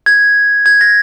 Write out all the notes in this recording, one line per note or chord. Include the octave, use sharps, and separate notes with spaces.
G#6
G#6
A#6